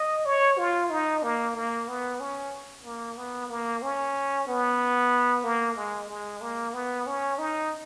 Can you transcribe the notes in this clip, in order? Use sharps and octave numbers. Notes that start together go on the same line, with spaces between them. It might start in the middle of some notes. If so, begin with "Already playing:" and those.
Already playing: D#5
C#5
F4
D#4
A#3
A#3
B3
C#4
A#3
B3
A#3
C#4
B3
A#3
G#3
G#3
A#3
B3
C#4
D#4